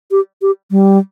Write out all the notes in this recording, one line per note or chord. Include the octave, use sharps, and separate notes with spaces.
G4
G4
G3